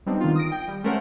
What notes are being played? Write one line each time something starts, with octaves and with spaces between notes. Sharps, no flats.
G3 B3 C4 D4 D#4
D#3 F4
D#6 A#6 D7
G5
G3
G#3 A3 C#4 A#4 C5 F#5